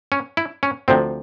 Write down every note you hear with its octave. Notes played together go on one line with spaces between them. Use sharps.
C#4
E4
C#4
D2 C3 F3 C4